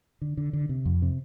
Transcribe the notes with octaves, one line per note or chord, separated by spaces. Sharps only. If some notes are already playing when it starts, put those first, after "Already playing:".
D3
D3
D3
C3
F2
C3